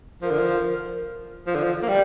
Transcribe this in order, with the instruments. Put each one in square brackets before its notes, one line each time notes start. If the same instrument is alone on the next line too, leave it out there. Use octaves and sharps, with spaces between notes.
[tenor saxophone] F3 [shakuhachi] A#4
[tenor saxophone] D3
F3
F3
D3
F3
A#3
[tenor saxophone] G3 [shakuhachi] G5